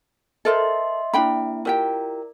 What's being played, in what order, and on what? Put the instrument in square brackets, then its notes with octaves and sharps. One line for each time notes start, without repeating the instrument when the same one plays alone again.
[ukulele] A4 A#4 C5 [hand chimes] D#5 E5 C6
[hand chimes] A#3 E4 [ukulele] D4 G5 B5
[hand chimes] E4 A#4 D5 [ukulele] F4 G4 G5